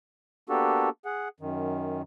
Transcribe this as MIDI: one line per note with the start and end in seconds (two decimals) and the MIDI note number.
0.49 0.89 58
0.49 0.89 59
0.49 0.89 62
0.49 0.89 66
0.49 0.89 67
0.49 0.89 69
1.05 1.28 68
1.05 1.28 78
1.40 2.02 42
1.40 2.02 51